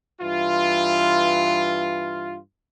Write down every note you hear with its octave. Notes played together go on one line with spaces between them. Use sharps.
G2 E3 F4